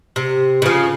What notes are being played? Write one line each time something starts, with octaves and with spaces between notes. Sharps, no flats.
C3
C#3 F3